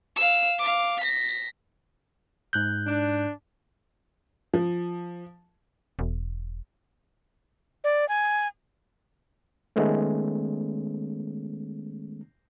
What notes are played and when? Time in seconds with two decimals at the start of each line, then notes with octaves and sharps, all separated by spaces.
0.16 F5 E6
0.59 F5 D6
1.01 A#6 B6
2.53 G#2 F#6 G6
2.87 D4
4.54 F3
5.99 E1
7.84 D5
8.09 G#5
9.76 D#3 G#3 A3 B3 C#4